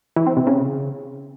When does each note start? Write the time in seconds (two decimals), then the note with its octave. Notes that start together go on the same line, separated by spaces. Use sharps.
0.16 E3
0.27 C4
0.37 C3
0.47 C#3